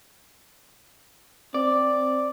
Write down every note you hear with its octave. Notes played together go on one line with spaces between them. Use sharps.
C4 D5